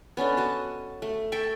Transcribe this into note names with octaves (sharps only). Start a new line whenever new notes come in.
B3 C#4 D4 A4
F#4 D#5 A5
A3
A4 E5 G5 C#6